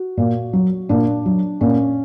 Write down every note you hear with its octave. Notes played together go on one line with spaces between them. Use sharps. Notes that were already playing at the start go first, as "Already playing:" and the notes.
Already playing: F#4
A#2
F#3
A#2 D4
F#3
A#2 C#4